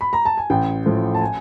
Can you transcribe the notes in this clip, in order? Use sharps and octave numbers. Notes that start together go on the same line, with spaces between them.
B5
A#5
A5
G#5
A1 G5
A2 F3
A5
G#5